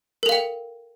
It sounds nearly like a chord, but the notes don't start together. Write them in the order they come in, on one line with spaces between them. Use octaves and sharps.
A#4 A4 F5 G5